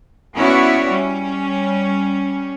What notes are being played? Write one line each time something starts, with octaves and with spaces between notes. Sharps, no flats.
B3 C#4 E4 F#4 C#5 D5
G3 C#4